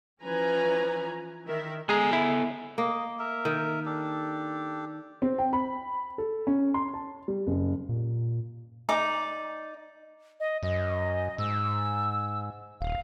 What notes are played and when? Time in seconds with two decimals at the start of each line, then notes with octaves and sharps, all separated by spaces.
0.23 E3 F3 C#4 B4 G#5 A#5
1.47 D#3 E4 A#4 E5
1.89 G#3 B3 G#4 A4 G#5 A#5
2.13 E4
2.78 A#3 D#5
3.19 A#4 E5
3.45 D#3
3.86 D4 G4 A4
5.22 C4
5.38 G5
5.53 B5
6.18 A4
6.47 C#4
6.74 C6
6.94 A5
7.28 G3
7.47 F#1
7.89 A#2
8.89 D#4 D5 A#5 D6
10.40 D#5
10.63 F#2 D#5
11.38 G#2 E6
12.81 D#1 F5